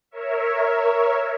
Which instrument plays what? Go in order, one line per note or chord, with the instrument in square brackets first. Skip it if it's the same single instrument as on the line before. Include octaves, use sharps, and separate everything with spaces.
[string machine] A#4 C#5 E5